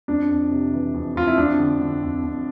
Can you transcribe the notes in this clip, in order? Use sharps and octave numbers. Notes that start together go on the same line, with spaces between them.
F2 D4
F2
C3
E3
F2
F2 F4
E4
F2 D4
D3
D3
F2
F2